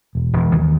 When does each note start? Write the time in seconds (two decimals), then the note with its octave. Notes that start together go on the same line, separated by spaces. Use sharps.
0.15 E1
0.33 E1
0.52 D#2